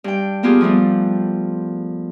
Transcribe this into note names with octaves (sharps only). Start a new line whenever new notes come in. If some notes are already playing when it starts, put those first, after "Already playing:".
G2 G5
A#3 B3 F4 G4 G#4
F3 G3 A3 B3